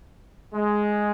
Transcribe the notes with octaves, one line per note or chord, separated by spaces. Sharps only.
G#3